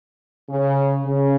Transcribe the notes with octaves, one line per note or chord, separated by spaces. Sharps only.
C#3
C#3